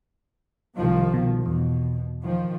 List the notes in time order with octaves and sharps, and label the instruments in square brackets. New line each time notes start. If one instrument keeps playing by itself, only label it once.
[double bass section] C2 D#3 F3
[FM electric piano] B2
[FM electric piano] E2 [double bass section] B2
[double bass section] D#3 F3